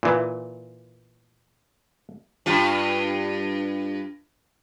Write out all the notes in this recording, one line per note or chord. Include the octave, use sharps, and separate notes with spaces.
A#2 E3
G2 F4